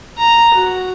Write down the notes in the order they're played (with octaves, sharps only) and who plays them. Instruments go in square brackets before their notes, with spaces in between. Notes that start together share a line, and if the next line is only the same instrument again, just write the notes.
[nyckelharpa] A#5
F#4